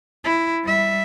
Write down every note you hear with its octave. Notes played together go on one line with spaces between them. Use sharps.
E4
G3 E5